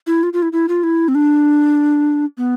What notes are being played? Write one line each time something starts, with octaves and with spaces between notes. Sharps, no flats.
E4
F4
F4
E4
E4
F4
E4
C4
D4
B3